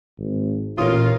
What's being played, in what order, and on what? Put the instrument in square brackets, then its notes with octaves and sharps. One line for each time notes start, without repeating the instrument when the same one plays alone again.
[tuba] G#1
[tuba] A1 [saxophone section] D#2 F4 [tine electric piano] A#2 [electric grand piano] A#4 C#5 D#6